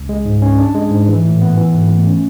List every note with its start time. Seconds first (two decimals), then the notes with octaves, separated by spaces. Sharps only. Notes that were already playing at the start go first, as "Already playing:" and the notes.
Already playing: C#2
0.09 G#3
0.25 G#2
0.42 C#4
0.58 D4
0.75 G#3
0.91 G#2
1.08 E3
1.25 A2
1.41 B3
1.58 E3
1.74 G#2
1.91 A3
2.07 C#4